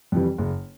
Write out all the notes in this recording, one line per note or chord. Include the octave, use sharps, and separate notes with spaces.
F2 C3 E3 G3
F#1